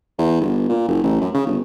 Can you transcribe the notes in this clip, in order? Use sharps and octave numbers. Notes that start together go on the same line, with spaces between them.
E2
G1
A#2
F#1
A1
F#2
C#3
G1